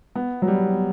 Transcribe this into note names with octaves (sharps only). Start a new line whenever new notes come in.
B3
F#3
G3